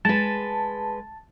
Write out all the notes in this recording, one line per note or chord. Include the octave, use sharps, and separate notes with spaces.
G#3 B4 A5